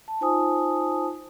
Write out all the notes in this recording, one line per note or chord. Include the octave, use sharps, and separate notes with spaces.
A5
D#4 F4 C5 G#5 A5 D#6